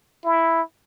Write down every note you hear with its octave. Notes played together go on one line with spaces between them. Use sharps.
E4